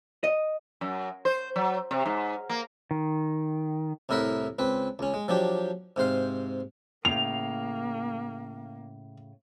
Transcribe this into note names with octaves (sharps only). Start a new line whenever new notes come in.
D#5
F#2
C5
F#3
C3
G#2
A#3
D#3
C2 A2 E4 A#4 E5 F#5
C#2 C4 B4
C#2 C#4
G#3
F3 F#3 D4 G4
G#2 C3 C5 F5
A2 C#3 A#3 F7